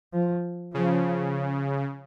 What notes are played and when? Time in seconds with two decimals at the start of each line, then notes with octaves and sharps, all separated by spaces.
0.13 F3
0.74 C#3 F3